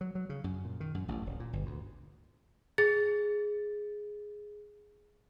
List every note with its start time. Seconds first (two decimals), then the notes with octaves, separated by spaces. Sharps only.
0.01 F#3
0.15 F#3
0.29 C#3
0.44 F#2
0.65 A#2
0.80 D#3
0.94 F#2
1.08 A1
1.26 D1
1.40 A#2
1.53 G1
1.66 D2
2.78 G#4 A6